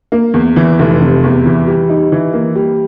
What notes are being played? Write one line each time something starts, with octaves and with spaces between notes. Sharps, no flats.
A#3
E2
E3
F1
C3
E2
E3
G3
D#4
E3
A#3
G3